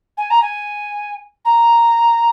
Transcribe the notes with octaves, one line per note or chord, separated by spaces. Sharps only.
G#5
A#5
G#5
A#5